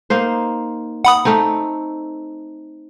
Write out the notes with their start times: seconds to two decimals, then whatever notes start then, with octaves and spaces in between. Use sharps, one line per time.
0.10 A#3 D#4 C5
1.05 F#5 B5 D#6
1.25 A3 C4 D#4